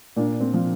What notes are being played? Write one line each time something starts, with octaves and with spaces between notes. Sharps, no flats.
A#2 D4
C4
F3